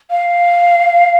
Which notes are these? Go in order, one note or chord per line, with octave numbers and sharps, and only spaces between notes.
F5